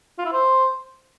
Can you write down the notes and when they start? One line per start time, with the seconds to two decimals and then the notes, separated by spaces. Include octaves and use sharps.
0.18 F4
0.25 E4
0.32 C5